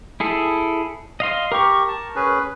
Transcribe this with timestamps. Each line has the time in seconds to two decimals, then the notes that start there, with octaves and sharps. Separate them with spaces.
0.20 E4 G#4 A4
1.20 D#5 F5 C6
1.52 G4 A#4 C#6
1.88 A5
2.16 C#4 G#4 B4